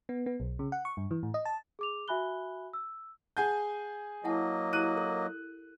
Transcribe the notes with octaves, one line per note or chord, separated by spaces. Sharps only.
B3
B3
B1
C#3
F#5
C#6
G2
E3
A2
D#5
A5
G#4 D6 F7
F#4 E5 G#5 B5 F#6 G7
E6
G#4 F#5 G#5 A5 G6
F#3 A#3 E4 D#5 F#5 A5
E4 G4 F#6 D#7
A4 A#4